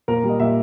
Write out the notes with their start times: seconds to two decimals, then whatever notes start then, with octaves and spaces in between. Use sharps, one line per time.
0.08 A#2 A#4
0.24 G3
0.29 D#5
0.40 A#2 E5